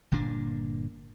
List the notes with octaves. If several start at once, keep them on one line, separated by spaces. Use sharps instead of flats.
G1 A#2 A#3 D4